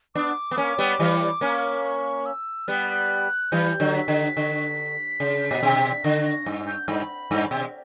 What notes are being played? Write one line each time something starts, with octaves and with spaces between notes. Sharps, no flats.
B3 D4 D6
B3
A#3 C#4
G3 B3
E3 G3
A#3 C#4
C#6
E6
G3 B3 F#6
E3 G3 G6
D3 F#3
B6
D3
D3
C#3
A#2
B2
D3 A#6
A#6
G2
G6
G2 B5
G2
B2